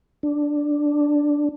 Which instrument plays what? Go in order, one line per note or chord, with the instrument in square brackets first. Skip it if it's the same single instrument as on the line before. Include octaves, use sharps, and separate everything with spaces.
[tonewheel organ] D4